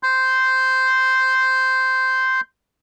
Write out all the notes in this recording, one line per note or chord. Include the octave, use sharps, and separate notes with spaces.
C6 G6